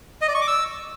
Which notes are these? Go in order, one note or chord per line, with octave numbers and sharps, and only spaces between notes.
D#5
D5
C#6
D6
E6